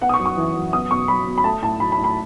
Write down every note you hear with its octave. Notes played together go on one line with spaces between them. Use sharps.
B3 F#5
D#6
C#6
F#2
C#6
E3
F#2
B3 D#6
B2 C#6
F#3 B5
B2
B5
A3 A5
A2 A5
F#3 B5
B5
A2
B5